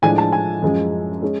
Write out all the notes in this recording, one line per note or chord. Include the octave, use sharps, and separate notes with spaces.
A2 F3 G#3 D4 G#5
A5
G#5
F#2 F3 G#3
G#3 C#4